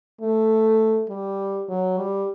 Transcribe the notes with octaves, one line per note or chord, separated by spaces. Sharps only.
A3
G3
F#3
G3